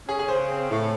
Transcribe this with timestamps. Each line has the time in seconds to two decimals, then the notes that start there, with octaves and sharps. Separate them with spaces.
0.08 C#4 G#4
0.19 G#4
0.28 C#3 C5
0.50 C4
0.71 A2